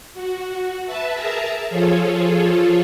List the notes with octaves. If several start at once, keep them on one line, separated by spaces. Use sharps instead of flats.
F#4
B4 E5 A5
G#4 A#4 E5 A5 A#5
F3 F4 G#4 A4 C#5